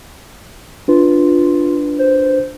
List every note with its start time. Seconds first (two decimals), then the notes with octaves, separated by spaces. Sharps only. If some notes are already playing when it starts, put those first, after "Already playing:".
0.88 D4 F4 B4
1.99 C5